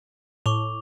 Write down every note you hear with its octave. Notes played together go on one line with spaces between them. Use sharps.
A2 C#6 D6 F7